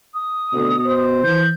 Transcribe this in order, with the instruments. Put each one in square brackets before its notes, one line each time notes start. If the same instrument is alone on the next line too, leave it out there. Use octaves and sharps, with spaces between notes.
[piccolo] D#6
[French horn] D2 [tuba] B2
[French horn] C5
[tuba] E3 [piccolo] G6